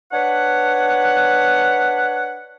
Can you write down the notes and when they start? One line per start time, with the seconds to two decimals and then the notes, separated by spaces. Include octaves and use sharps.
0.12 D4 B4 C#5 F#5